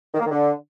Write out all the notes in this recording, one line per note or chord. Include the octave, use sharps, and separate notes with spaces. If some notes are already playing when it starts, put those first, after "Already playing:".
D#3
A#3
D#3
D3